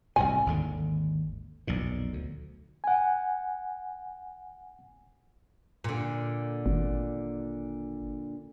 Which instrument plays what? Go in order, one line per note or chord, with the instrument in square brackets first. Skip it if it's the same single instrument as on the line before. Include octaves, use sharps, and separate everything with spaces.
[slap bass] C2 A2 C3 [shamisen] G#5
[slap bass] G#1 D#2 D3
B1 F2 A#2
D2
[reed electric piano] F#5 G#5
[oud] A#2 D3
[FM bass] G#1